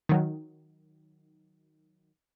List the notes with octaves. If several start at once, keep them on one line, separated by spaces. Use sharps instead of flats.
D#3 F#3